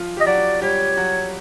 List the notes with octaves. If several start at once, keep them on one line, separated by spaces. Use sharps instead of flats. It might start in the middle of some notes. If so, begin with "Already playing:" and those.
Already playing: F3 F4
G4 D#5
F#3 F#4 D5
G3 G4 C#5
F#3 F#4